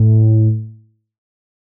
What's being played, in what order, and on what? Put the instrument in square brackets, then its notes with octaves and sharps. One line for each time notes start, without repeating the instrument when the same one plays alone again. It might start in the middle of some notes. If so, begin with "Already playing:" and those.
Already playing: [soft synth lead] A2